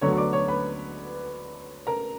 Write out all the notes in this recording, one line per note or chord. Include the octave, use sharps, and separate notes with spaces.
D2 D3 F#3 B3 C#5 C#6
C#6
D5 D6
C#5 C#6
B4 B5
A#4 A#5